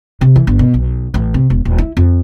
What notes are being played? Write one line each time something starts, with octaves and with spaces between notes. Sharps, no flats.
C3
E3
G1
B2
B1
A1
C3
E1
D#1
E4
F2